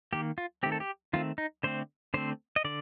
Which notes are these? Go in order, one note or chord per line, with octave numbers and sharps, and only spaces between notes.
D#3 A#3 G4
F4
D#3 A3 C4 G4
A4
G4
D#3 A3 C4 F4
D#4
D3 A3 C4 C5
D3 A3 C4 C5
D#5
D3 D5